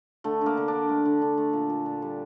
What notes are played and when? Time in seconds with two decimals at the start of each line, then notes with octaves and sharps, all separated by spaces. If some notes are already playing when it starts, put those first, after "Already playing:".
0.24 D3 A3
0.41 D3 A#3
0.57 D3
0.68 D3 D4
0.89 A3
1.05 D3
1.22 D3
1.38 A3
1.53 A#2
1.70 A#2
1.86 A#2
2.02 G3